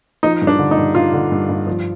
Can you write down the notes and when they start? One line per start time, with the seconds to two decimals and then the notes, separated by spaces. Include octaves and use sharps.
0.23 F3 D#4
0.42 G2
0.47 D4
0.59 D3
0.71 D#4
0.78 G2
0.95 G2 F4
1.13 D3
1.32 G2
1.49 G2
1.67 F3